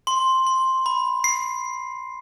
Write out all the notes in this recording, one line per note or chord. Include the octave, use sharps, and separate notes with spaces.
C6
C6
B5
C7